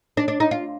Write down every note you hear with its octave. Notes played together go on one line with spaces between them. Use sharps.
D4
D4
D#4
F4